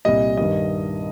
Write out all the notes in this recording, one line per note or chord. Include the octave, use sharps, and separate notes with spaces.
C2 A#2 G3 D#5
G2 D#3 G3 D#5